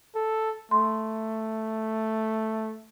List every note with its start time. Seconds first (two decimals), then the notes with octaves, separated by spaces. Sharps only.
0.15 A4
0.71 A3 C6